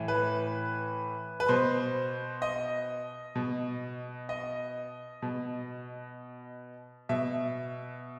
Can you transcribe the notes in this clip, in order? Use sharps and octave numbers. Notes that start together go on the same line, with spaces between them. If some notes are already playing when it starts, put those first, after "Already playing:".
Already playing: A2 E3
B4
B4
B2 C5
D#5
B2
D#5
B2
B2 E5